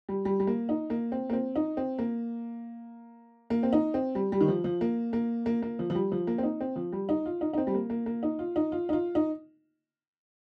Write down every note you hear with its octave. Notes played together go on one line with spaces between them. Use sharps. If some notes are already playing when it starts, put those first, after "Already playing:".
G3
G3
G3
A#3
D#4
A#3
C4
A#3
C4
D#4
C4
A#3
A#3
C4
D#4
C4
G3
G3
D#3
F3
F3
A#3
A#3
A#3
A#3
F3
F3
G3
F3
A#3
C4
D#4
C4
F3
G3
D#4
F4
D#4
D#4
C4
G3
A#3
A#3
A#3
D#4
F4
D#4
F4
D#4
F4
D#4